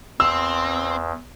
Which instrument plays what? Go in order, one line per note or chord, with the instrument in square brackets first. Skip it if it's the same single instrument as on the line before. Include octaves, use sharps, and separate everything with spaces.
[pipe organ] E2 [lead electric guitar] C4 [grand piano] E6